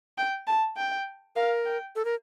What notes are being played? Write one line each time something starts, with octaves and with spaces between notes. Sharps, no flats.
G5
A5
G5
A#4 F5
G5
A4
A#4